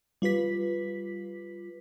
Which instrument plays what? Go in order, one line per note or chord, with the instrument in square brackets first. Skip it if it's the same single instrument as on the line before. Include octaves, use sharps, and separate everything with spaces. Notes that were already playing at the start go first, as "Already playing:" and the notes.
[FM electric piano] G3 F4 B4 B6